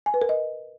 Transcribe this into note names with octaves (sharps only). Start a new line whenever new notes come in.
G#5
B4
A#4
D#5